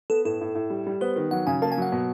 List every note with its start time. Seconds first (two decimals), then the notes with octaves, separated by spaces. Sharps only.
0.10 B3 A4
0.25 A2 A4
0.41 A2
0.55 A2
0.70 G3
0.87 G3
1.01 B3 C5
1.16 D#3
1.31 F#3 F#5
1.47 C#3 G#5
1.62 A#3 A5
1.72 G#5
1.77 F#3 F#5
1.92 B2